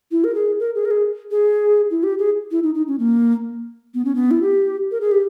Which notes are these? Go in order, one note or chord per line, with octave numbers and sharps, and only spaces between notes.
E4
A#4
G#4
A#4
G#4
A#4
G#4
G#4
E4
G4
G#4
E4
D#4
D#4
C#4
A#3
B3
C#4
B3
E4
G4
A#4
G#4
G4